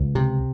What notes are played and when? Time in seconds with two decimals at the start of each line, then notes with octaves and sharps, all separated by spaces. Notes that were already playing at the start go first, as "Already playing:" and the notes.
Already playing: C#2
0.15 C3